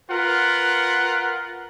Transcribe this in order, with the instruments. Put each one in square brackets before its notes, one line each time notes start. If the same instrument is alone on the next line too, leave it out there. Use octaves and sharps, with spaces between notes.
[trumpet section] F4 A#4 B4 F#5